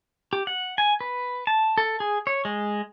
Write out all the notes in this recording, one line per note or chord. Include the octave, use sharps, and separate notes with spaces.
G4
F#5
G#5
B4
A5
A4
G#4
C#5
G#3